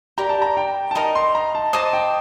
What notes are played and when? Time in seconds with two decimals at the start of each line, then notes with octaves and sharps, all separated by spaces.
0.18 G4 A#4 D5 A#5
0.29 A5
0.42 A#5
0.57 G5
0.91 A5
0.95 D#4 A#4 D#5 A#5
1.15 C6
1.35 A#5
1.55 A5
1.73 C5 D#5 A5 D6 D#6
1.93 G5